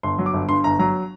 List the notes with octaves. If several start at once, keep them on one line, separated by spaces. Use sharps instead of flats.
G1 C6
F#3
D6
G1
G2 C6
G1 A#5
F#3 A#5